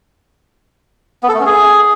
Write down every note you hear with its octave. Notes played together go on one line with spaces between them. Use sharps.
B3
A4
A3
C#4
G#4